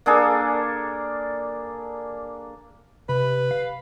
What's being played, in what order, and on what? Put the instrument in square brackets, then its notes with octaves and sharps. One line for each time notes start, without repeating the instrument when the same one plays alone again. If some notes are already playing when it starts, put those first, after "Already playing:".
[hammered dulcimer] A#3 D4 G#4 A4
[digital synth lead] C3 [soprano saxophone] B4
[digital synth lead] F5